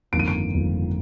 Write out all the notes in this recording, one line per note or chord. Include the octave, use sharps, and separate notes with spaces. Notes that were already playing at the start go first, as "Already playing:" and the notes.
G1 F2 D#3 A#3 D7
D#7
D7
G1 F2 D#3 A#3